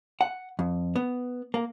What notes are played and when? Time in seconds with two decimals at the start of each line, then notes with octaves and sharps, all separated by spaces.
0.21 F#5
0.59 F2
0.96 B3
1.54 A#3